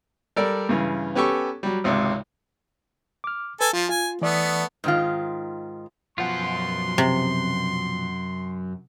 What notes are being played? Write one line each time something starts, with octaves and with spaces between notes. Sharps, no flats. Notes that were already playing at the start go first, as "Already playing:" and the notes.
G3 A4 A#4 D5
G2 C#3 E3
B3 C#4 G4 A4 C#6
F#3 G3
G#1 C#2 C3
D6 F6
A4 B4 G#5
F3 F4
F4 G#5
E3 A3 B3 D5 D#6
G#2 D#3 F4
F#2 B2 F3 F4 F#5 C6
C3